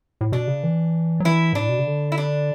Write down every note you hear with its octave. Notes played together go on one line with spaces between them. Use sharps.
A2
B2 D4
C#3
E3
F#3
E3 E4
G#2 D4
A2
B2
C#3
D3
E4
D4